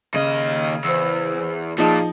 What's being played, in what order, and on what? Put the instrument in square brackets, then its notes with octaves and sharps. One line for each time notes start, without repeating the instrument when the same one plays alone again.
[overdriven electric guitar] D#2 D#5 [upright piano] C#3
[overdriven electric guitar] E2 [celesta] C5 E6
[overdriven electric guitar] A#2 [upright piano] F3 D#4 [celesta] G#4 A5